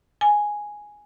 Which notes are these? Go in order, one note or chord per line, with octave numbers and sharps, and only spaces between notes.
G#5